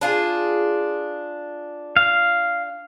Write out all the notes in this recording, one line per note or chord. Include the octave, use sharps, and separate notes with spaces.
D4 F4 G#4
F5